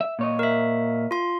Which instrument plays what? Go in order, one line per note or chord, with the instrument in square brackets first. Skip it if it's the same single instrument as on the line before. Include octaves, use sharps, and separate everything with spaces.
[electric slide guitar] E5
A#2 C#5 D#5
[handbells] A#4 E5
F4 C6